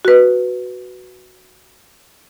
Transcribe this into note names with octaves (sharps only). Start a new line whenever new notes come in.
F#4 B4